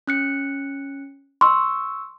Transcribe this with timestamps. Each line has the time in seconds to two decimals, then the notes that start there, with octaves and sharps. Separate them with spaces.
0.07 C#4 F#6 C#7
1.41 C6 C#6 E6